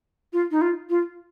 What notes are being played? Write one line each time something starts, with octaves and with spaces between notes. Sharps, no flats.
F4
D#4
F4
F4